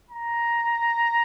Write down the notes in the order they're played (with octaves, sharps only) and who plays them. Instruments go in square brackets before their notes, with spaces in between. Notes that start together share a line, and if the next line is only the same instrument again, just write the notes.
[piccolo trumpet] A#5